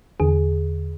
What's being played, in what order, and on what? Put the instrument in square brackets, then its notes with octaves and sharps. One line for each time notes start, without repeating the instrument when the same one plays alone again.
[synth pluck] E2 D3 G#4